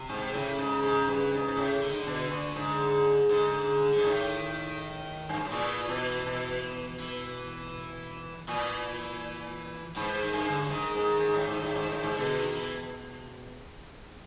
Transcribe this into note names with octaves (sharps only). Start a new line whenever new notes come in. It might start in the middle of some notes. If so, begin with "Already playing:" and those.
Already playing: C3
G#2
A2 C#3
G#2
G#2
G2
G#2
G#2
A2
D3
D#3
D3
B2
A#2
G#2
G#2 D3
G#2 D3
A2 D#3
G2
G#2
A2
A#2 E3
B2
B2
E3
A#2 E3
G#2 E3
D#3
G2
D3
G#2 D#3
G#2
G#2
A2
G#2
A2
G#2
A2
G#2
B2 D3
D#3
E3